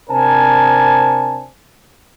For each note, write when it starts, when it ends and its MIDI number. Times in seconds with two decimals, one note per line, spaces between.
0.10 1.45 48
0.10 1.45 62
0.10 1.45 70
0.10 1.45 72
0.10 1.45 80
0.10 1.45 81